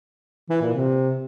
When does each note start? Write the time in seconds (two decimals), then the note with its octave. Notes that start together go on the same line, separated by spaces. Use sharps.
0.50 E3
0.62 A#2
0.74 C3